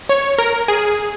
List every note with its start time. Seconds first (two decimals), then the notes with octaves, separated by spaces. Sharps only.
0.09 C#5
0.38 A#4
0.68 G#4